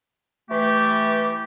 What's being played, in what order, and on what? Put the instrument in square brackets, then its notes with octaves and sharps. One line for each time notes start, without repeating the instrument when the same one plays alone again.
[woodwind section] E3 A3 G4